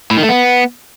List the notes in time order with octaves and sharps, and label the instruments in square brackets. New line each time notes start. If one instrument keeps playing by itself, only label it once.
[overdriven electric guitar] A2
D#3
A3
B3